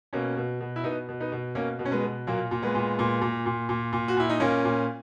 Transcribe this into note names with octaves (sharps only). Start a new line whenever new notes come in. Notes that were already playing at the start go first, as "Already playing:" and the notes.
B2 A#3 C#4
B2
B2
E4
B2 B3 D#4
B2
B3 D#4
B2
B2 A#3 C#4
B2
C#4
G#3 B3
B2
A#2 F#3 A#3
A#2
G#3 B3
A#2
A#2
A#2
A#2
A#2
A#2
F#4
A#2 E4
D#4
A#2 A#3 C#4
A#2